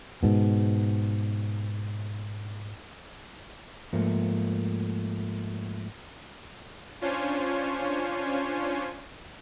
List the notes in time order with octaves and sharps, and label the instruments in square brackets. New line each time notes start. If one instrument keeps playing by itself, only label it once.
[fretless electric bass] G#2 B2
[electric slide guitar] G#2 F3 A3 A#3
[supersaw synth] C#4 D4 F4 C5 C#5 G#5